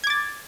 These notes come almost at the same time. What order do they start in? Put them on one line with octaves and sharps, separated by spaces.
G#6 D6 A6